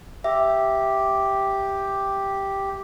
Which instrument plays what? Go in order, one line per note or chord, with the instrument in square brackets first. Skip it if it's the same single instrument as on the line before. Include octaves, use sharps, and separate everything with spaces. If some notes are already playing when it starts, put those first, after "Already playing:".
[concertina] G4 [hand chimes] E5